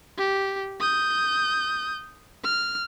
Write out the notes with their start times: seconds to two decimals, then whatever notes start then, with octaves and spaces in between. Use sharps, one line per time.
0.18 G4
0.80 D#6 G6
2.44 F6